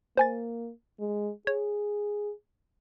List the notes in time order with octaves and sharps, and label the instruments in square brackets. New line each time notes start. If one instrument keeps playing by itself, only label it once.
[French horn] A#3 [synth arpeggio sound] C5 G#5 A6
[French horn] G#3
[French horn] G#4 [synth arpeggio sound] C#5